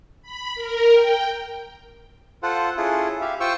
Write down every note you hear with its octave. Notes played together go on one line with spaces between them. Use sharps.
B5
A#4
G5
F4 A4 C5 F#5
C#4 E4 F4 G#4 A4
G4 E5 F5
F4 C5 G5 C#6 E6